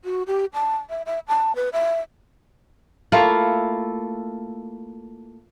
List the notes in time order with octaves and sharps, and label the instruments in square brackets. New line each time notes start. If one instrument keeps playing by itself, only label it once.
[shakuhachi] F#4
G4
A5
E5
E5
A5
B4
E5
[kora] A3 A#3 E4 F4